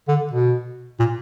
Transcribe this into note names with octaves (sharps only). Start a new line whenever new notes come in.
D3
B2
A#2